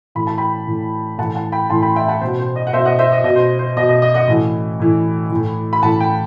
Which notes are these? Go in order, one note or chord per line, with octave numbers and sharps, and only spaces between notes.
A2 E3 B5
A5
G5 B5
A2 E3
A2 E3 F#5 A5
F#5 A5
G5 B5
A2 E3 A5 C6
G5 B5
E5 G5
F#5 A5
B2 C5
C5
D#5
F#5
B2 C5 E5
D#5 F#5
C5 E5
D#5
B2 D#5
C5
C5
B2 D#5
D#5
D#5
D#5 F#5
A2 E3
A2 E3
A2 E3
B5
A2 E3 F#5 A5
G5 B5